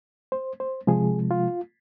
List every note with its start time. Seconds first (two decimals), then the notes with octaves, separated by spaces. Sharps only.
0.32 C5
0.60 C5
0.87 C3 F3 G#3 G#4
1.31 F4